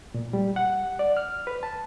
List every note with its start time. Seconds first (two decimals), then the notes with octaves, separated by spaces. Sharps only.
0.14 A#2
0.33 G3
0.56 F#5
0.99 D5
1.17 F6
1.47 B4
1.63 A5